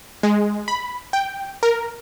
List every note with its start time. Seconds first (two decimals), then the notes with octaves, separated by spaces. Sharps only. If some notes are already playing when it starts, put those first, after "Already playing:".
0.23 G#3
0.68 B5
1.13 G5
1.63 A#4